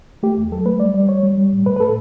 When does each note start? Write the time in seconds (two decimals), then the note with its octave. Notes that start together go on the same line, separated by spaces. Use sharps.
0.23 A3 G4
0.37 E2
0.52 F#3 A4
0.65 A3 B4
0.80 G3 D5
0.94 G3 D5
1.09 G3 C#5
1.23 G3
1.38 G3
1.52 A2
1.66 A2 B4
1.76 B4
1.80 A2 A4